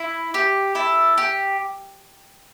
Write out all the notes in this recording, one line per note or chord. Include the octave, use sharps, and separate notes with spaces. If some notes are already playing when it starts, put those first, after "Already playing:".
Already playing: E4
G4
E4 A4
G4